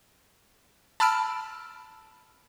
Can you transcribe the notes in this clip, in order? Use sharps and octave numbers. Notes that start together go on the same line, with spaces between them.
A5 B5 E6 F6 D7